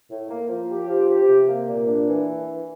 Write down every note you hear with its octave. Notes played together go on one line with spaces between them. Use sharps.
A2
A#3
F3
G4
F3
G4
C3
A#3
A#2
D4
E3